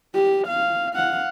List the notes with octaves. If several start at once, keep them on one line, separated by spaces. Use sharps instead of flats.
G4
F5
F5 F#5